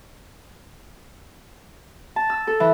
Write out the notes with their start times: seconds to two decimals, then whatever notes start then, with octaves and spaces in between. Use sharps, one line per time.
2.16 A5
2.30 E6
2.47 A4
2.60 E3